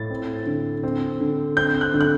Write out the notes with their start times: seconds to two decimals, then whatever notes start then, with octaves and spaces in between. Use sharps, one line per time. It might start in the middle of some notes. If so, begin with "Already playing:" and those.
Already playing: A2 A6
0.10 C4
0.46 D3
0.83 C4
1.20 D3
1.57 C4 G6
1.81 F#6
1.94 D3
2.01 F#6